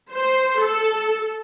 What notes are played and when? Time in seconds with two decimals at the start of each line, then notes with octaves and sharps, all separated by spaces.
0.11 C5
0.59 A4